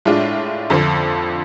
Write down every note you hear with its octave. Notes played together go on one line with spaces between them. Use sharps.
A2 G#3 D4 F4
F2 D3 F3